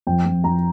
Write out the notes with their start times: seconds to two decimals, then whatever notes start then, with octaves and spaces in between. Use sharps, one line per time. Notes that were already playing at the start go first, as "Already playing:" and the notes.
0.07 F2 G5
0.26 F2
0.44 F2 A#5